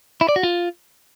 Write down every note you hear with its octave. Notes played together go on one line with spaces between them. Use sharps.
E4
D5
F#4
F4